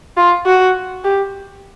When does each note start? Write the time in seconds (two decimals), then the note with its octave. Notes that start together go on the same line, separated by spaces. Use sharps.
0.17 F4
0.46 F#4
1.04 G4